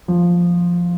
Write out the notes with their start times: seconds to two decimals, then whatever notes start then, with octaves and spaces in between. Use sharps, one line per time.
0.08 F3